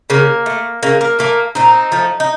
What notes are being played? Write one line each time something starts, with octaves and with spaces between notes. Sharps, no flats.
C#3 A#3
A3
C#3 A#3
A#3
A3 A#3
A#2 C4 D#4
F3 A3
D#4